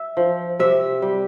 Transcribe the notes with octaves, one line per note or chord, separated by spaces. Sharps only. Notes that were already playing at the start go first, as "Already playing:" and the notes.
Already playing: E5
F3
C3 E5
G3